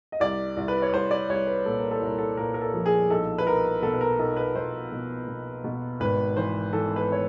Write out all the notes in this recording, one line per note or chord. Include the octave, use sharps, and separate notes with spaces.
D#5
C2 D5
C2
B4
C#5
C2 C5
D5
C2 C#5
B4
A#2 A4
A#4
A4
C2 A#4
A4
A#2 A#4
A#4
A4
F3
G#4
B1 A4
B4
B1 A#4
B2 A4
B4
A#4
B1 A4
B4
B1 C5
B2
B2
B2
G#1 B4
E3 C5
E3 A4
B4
C#5